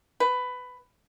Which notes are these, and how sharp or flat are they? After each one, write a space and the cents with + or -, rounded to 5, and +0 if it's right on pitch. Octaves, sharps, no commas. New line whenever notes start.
B4 +15